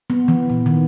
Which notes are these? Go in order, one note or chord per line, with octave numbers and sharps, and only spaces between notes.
B3
E3
A#2
D#3